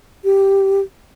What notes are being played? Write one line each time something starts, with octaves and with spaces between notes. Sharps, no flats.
G4